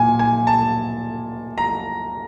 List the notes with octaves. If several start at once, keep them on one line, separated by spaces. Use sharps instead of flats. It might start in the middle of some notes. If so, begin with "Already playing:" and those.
Already playing: A#2 G#5
G#5
A5
A#5